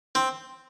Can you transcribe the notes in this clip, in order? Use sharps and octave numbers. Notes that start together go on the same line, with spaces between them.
C4